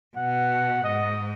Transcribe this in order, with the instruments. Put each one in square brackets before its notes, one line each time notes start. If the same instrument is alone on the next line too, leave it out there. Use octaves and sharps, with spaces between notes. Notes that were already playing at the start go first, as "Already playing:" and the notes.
[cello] B2 [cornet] F#5
[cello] G#2 [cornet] D#5